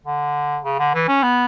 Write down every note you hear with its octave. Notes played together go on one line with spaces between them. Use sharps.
D3
C#3
D3
E3
C#4
B3